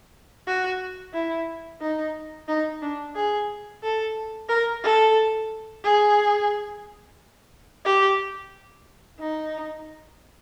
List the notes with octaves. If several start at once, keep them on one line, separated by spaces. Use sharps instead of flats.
F#4
E4
D#4
D#4
D4
G#4
A4
A#4
A4
G#4
G4
D#4